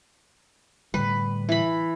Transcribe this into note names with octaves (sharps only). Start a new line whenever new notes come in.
A2 D3 G3 B4
E3 B5